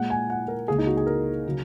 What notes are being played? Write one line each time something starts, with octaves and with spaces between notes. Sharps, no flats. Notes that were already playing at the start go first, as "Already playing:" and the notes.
Already playing: A#2 G#3 F#5
G#5
F#5
A#4
C#2 C#3 A#3 G#4
D#4
F#4
G#4
A#4
C#3 F#3